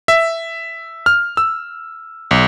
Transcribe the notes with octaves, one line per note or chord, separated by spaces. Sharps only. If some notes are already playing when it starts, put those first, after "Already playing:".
E5
F6
E6
B1